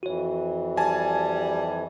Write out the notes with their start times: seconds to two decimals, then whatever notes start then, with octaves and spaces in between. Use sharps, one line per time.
0.03 F2 E3 F#4 C#5
0.77 G3 G#5 A5